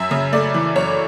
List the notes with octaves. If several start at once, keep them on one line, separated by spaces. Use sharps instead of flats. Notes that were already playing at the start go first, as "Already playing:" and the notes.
Already playing: F#2 E5
C#3
A3 D5
E3
F#2 C#5